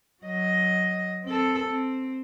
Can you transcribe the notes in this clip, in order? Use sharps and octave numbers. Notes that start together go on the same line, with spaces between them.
F#3 D#5
C4 A4
C4